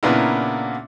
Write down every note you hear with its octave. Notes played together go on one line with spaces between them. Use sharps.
A#2 C#3 A#3 B3 D4 E4